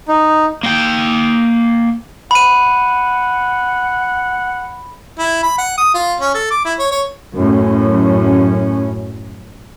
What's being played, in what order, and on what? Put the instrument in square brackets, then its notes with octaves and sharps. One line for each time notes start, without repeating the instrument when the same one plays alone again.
[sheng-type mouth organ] D#4
[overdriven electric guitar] A#3 G5
[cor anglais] F#5 [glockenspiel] B5 D#7
[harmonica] E4
B5
F#5
D#6
F4
C#4
A4
D6
E4
C#5
C#5
[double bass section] F#2 A2 C#4